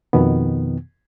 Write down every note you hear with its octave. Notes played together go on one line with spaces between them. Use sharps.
F2 B2 D#3 B3